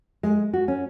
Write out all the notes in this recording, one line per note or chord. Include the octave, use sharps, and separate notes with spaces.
G#3
F#4
C#4